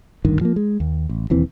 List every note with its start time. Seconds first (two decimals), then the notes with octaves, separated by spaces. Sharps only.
0.25 G#1 D2 G2 D#3
0.41 F3 G#3 A#3
0.56 G#3
0.80 D#2
1.09 A1
1.30 E1 D#2 E3 C4